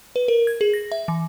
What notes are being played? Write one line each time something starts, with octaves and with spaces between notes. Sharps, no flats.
B4
A#4
G#6
G#4
A#6
E5
E3